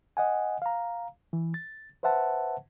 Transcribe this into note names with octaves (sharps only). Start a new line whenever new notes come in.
D#5 F#5 G#5
F5 A#5
E3
A6
B4 C5 E5 F#5 A5